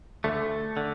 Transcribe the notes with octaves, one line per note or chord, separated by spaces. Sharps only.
D2 D3 A3
D3